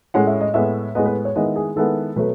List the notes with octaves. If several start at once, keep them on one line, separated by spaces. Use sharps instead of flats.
A2 G#3 C#4 F#5
E5
D#5
A2 G#3 B3 E5
A2 G#3 B3 D#5
B4
C#5
D#3 G#3 B3 E4 D#5
G#4
D#3 G#3 B3 E4 A4
B2 F#3 A3 B4